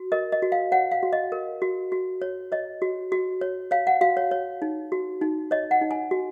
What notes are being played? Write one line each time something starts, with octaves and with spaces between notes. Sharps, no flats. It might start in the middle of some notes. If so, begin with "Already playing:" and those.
Already playing: F#4
A#4 D#5
D#5
F#4
F5
C#5 F#5
F5
F#4
D#5
A#4
F#4
F#4
C#5
C#5 D#5
F#4
F#4
C#5
C#5 F5
F#5
F#4 F5
C#5
C#5
D#4
F#4
D#4
C#5 D#5
F#5
D#4
G#5
F#4